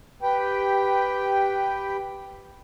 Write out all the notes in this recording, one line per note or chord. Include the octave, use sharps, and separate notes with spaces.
G4 B4 G5